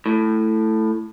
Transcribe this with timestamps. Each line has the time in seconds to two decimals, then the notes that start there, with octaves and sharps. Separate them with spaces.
0.06 A2